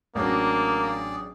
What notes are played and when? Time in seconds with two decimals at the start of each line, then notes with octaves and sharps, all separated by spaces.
0.15 A1 F#3 A#3 D4 G#4 D5